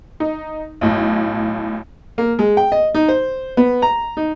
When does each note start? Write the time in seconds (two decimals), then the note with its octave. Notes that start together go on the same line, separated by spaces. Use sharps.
0.20 D#4
0.81 B1 A2
2.18 A#3
2.39 G#3
2.57 G5
2.72 D#5
2.95 D#4
3.08 C5
3.57 B3
3.82 A#5
4.17 D#4